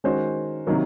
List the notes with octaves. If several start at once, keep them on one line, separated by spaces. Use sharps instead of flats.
D#3 G#3 C#4 F#4 C5
C3 D#3 F#3 A#3